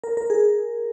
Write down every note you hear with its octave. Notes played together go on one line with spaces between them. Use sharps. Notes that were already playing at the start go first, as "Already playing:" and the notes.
A#4
A#4
G#4